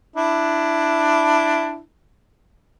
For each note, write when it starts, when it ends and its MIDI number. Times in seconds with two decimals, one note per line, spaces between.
0.16 1.79 62
0.16 1.79 64